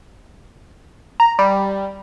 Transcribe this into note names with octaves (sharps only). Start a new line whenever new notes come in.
A#5
G3